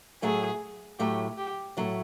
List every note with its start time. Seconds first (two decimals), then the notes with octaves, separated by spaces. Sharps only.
0.22 A2 F#3 A3 G#4
0.99 A2 F#3 A3 G4
1.38 G4
1.77 A2 F#3 A3